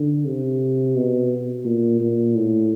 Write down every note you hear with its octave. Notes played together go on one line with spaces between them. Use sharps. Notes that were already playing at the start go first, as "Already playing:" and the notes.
Already playing: D3
C3
B2
A#2
A#2
A2